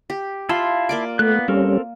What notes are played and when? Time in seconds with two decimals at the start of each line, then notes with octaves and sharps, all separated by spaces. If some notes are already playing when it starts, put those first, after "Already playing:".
0.10 G4
0.49 E4 F4 A5 B5 C6
0.89 A#3 D5 D6
1.19 A3 B3 F#6
1.48 G3 C4 C#4 A4 A#4